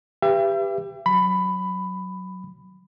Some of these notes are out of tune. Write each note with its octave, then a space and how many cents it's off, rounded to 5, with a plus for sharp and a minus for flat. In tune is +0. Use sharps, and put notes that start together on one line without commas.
G4 +15 B4 +0 E5 +40
F#3 +0 B5 +10